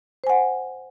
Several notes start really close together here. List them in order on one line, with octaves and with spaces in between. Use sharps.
C5 G#5 F#5